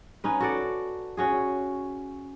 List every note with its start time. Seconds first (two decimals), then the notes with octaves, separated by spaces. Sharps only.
0.24 C#4 D#4 B4
0.40 F#4 A4 D5
1.17 C#4 F#4 G#4